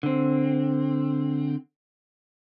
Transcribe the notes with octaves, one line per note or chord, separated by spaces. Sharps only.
D3 C4